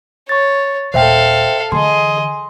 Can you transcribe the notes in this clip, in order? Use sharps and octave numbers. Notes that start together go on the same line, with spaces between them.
C#5 C#6 A6
D#1 A#2 A4 C5 E5 F5 G5
D3 E3 G#4 D#5 C6